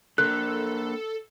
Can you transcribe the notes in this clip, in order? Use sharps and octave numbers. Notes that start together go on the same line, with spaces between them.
A#3 D4 A4 A#4 F#6